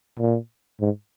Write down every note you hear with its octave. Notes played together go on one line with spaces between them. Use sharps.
A#2
G#2